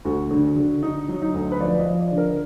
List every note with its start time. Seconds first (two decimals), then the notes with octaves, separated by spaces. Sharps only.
0.05 D2 F#4
0.31 D3
0.56 D3
0.83 D3 D#4
1.08 F#3
1.22 D#4
1.34 D2
1.52 B4
1.60 F3 D5
1.80 D#5
1.85 F3
1.99 D5
2.12 D3
2.18 A#4